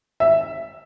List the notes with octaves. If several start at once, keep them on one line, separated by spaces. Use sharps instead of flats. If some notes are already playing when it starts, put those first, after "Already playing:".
E5